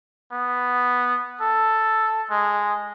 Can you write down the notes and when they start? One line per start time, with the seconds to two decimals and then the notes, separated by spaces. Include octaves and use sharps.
0.32 B3
1.41 A4
2.30 G#3